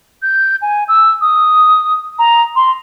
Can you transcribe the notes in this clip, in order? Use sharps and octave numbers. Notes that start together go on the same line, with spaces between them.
G6
G#5
E6
D#6
A#5
C6